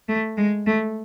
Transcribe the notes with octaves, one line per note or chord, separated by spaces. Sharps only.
A3
G#3
A3